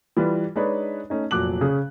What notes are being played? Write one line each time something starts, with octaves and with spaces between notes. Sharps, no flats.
E3 G3 F4 B4
G#3 D4 D#4 B4 C#5
A3 C#4 D#4
F1 A#2 F#3 D6 F#6 F#7
C#3 C#4 G#4